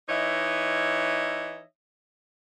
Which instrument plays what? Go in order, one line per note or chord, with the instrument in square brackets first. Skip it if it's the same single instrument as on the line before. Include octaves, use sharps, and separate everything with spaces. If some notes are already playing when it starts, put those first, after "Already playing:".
[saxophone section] E3 D#4 C#5 D#5 E5